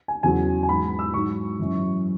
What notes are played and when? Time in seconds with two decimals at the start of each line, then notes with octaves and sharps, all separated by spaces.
0.08 G#5
0.23 E2 C#3 F#3 G#5
0.63 G#5
0.69 G#2 F#3 B5
0.99 E6
1.14 G#2 F#3 C#6
1.59 F#2 E3